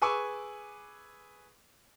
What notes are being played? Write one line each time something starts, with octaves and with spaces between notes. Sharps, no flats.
G#4 B4 G#5 C#6 D6 E6